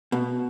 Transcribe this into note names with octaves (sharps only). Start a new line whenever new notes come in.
B2